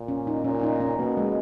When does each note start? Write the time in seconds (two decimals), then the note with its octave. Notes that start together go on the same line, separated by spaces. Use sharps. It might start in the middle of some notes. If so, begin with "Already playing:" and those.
Already playing: A#2
0.08 C#4
0.27 D#4
0.44 A#2 C#4
0.63 D#4
0.80 C#4
0.98 B2 A#3
1.17 G#3